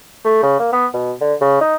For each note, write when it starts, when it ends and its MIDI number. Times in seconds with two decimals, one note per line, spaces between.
0.25 0.43 57
0.43 0.56 49
0.60 0.71 58
0.73 0.86 59
0.93 1.12 47
1.21 1.34 50
1.41 1.57 49
1.61 1.76 63